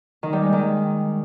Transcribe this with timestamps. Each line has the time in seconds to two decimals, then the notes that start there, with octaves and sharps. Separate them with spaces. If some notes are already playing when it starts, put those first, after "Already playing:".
0.23 D#3
0.33 G3
0.43 G#3
0.53 D#3